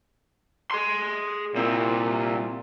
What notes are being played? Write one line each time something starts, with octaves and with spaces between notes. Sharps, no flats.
G#4 C6
C2 A#2 C4